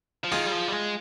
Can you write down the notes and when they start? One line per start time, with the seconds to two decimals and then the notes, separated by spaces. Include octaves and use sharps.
0.24 F3
0.31 D#3 F4 G#4
0.46 G3
0.52 F3
0.68 G3
0.72 G#3